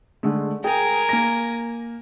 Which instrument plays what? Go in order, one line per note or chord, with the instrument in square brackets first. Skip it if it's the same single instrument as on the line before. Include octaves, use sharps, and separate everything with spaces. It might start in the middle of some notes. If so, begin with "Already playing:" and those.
[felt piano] D3 G#3 A3
[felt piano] G#4 G5 [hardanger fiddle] A#4 G#5
[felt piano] A#3 A#6